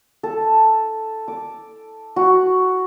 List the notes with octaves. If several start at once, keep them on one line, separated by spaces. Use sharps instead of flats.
A4
D6
F#4